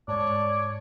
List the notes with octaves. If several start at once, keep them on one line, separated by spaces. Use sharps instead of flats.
G#2 C#5 D5 A5